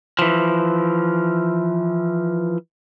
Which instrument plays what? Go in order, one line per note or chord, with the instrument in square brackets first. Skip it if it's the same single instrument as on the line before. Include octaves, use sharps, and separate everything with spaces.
[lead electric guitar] E3 F3